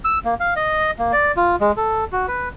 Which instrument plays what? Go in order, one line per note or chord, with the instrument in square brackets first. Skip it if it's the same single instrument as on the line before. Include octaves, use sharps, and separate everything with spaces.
[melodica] E6
A#3
F5
D#5
A#3
D5
F4
G#3
A4
F#4
B4